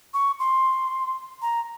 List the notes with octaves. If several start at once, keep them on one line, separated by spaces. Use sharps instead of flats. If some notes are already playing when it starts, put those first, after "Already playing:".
C#6
C6
A#5